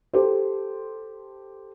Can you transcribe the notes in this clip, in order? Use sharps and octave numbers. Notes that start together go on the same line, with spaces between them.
G4 A4 C5